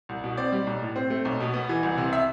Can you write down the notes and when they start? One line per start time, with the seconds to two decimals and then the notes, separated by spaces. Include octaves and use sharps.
0.09 C2
0.24 B2
0.37 C4 D5
0.52 G3
0.67 B1
0.82 A2
0.96 C4
1.10 A3
1.25 B1
1.40 B2
1.54 B3
1.69 E3
1.83 C2
1.98 C3
2.13 E5